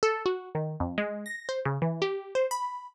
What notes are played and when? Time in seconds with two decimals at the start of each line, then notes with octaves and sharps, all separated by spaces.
0.03 A4
0.26 F#4
0.55 D#3
0.80 F2
0.98 G#3
1.26 A#6
1.49 C5
1.65 C#3
1.82 E3
2.02 G4
2.35 C5
2.51 B5